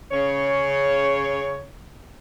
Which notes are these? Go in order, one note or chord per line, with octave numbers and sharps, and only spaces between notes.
C#3 C#5